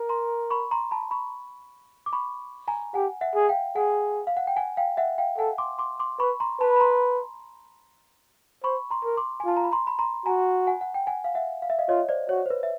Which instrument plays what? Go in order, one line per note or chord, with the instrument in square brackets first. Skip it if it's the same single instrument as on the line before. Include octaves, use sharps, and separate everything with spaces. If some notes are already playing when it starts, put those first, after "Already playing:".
Already playing: [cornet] A#4
[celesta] A#5 C6
B5 C#6
A#5 C6
A5 B5
B5 C#6
D6
B5 C#6
G#5 A#5
[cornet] G4 [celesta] F#5 G#5
[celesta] E5 F#5
[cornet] G#4
[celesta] F5 G5
[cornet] G#4 [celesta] F#5 G#5
[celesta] F5
F#5
G5
F#5 G#5
F5 G5
E5 F#5
F5 G5
[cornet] A4 [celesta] F#5 G#5
[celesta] C6 D6
C6 D6
C6 D6
[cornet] B4 [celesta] B5 C#6
[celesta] A#5 C6
[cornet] B4 [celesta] A5 B5
[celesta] B5
A#5 C6
[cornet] C5 [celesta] B5 C#6
[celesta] A#5 C6
[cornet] A#4
[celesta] C6 D6
G#5
[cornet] F4 [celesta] A5
[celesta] A#5
B5
A#5 C6
B5
A#5 C6
[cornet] F#4 [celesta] G#5 A#5
[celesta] F#5 G#5
F#5
G5
F#5 G#5
F5
E5 F#5
F5
E5
D#5 F5
[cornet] F4 [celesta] C#5 D#5
[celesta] C5 D5
[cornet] F#4 [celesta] C#5
[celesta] C5
B4
E5